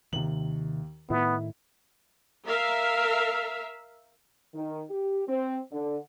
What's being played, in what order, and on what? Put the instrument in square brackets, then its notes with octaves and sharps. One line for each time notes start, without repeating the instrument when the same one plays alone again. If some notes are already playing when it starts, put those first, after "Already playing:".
[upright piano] D#2 F#7 [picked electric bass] C3 D#3
[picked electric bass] A2 D#3 [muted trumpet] B3 [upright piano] E4
[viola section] A#4 E5 F5
[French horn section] D#3
G4
C4
D3